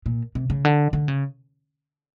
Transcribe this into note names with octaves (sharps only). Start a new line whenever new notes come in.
A#2
C3
C#3
D3
D3
C#3